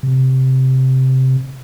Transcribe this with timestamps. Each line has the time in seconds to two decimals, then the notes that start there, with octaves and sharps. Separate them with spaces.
0.03 C3